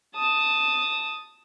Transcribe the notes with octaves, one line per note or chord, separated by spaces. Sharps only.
A5 D#6